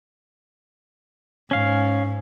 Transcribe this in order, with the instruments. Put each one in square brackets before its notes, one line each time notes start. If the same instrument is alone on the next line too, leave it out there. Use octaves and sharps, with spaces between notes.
[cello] G#2 [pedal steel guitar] C#4 F5